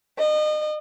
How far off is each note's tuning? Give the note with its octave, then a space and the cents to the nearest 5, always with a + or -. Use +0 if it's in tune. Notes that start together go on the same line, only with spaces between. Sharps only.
D#5 -35